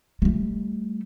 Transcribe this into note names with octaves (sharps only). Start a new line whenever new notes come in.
G3 A3